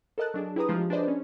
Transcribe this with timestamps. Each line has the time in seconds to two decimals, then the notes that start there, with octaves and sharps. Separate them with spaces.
0.18 A4 A#4 D#5 A5 F#6
0.34 F#3 D4 G#4
0.56 E4 G4 G#4 B4 A#5 D#6
0.68 F3 G#3 F4 G4
0.90 D4 G#4 B4 C5 D5 D#5
1.08 C#4